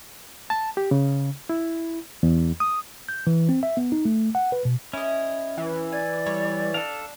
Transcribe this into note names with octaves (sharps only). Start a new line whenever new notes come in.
A5
G4
C#3
E4
E2
D#6
G6
E3
C4
E5
B3
D#4
A3
F#5
B4
B2
C#4 E4 D#5
E3
D5 G#5
G3 C#5
D4 A4 F5